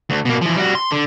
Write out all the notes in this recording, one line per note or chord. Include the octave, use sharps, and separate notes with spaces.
D2
B2 A#3
E3 F3
G3 F#4
C6
D3